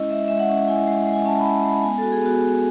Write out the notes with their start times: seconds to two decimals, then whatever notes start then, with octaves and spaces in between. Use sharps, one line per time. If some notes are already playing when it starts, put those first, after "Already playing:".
Already playing: G#3 C#4 E4 D#5
0.11 G#3 E5
0.28 G#3 E5
0.39 F#5
0.49 C#4
0.68 E4 G#5
0.88 G#3
1.07 G#3
1.13 G#5
1.26 C#4 A5
1.40 E4 B5
1.64 G#3 B5
1.83 B3 G#5
1.98 F#4 A4
2.12 G#4
2.22 B3 F#4
2.41 F#4